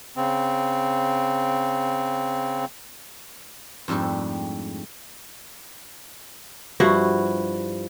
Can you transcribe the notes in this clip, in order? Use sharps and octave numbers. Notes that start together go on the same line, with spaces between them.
C#3 C4
F2 G#2 G3 A3 D4
G2 F3 E4 F#4